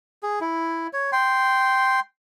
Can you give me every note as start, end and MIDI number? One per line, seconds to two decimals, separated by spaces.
0.23 0.39 68
0.41 0.87 64
0.93 1.11 73
1.12 2.00 79
1.12 2.00 84